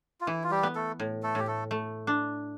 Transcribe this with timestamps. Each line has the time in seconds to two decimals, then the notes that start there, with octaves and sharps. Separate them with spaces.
0.21 F4
0.27 E3 E4
0.43 F4
0.51 G3 G4
0.63 B3
0.75 A3 A4
1.00 A2
1.23 A3 A4
1.35 A2 G4
1.47 A3 A4
1.71 A3
2.07 D4